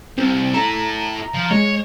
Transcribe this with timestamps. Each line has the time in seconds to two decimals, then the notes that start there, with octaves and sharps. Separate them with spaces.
0.18 C2 C4
0.54 E4 A4 A#5
1.34 F3
1.51 G#3 C#5